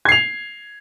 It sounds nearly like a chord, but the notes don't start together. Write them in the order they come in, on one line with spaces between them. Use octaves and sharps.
G#6 C7 F7